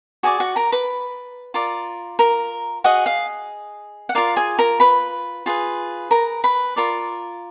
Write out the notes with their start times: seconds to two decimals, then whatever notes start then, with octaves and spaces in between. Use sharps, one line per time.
0.23 F#4 G#4 D5 G#5
0.40 F#4 F#5
0.56 A#4 A#5
0.72 B4 B5
1.54 F4 A#4 D5
2.19 A#4 A#5
2.84 F#4 G#4 D#5 F#5
3.06 F5
4.09 F#5
4.15 F4 A#4 D5 F5
4.36 G#4 G#5
4.59 A#4 A#5
4.80 B4 B5
5.46 F4 G#4 B4
6.11 A#4 A#5
6.44 B4 B5
6.76 F4 A#4 D5